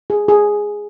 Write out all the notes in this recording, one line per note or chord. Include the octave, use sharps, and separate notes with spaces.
G#4
G#4